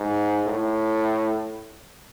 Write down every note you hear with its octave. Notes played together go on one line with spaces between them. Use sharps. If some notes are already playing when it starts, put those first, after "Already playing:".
Already playing: G#2
A2